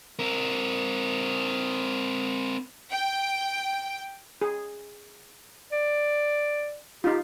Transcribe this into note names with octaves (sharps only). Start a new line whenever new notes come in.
C4 A#4
G5
G#4
D5
D#4 F4 G4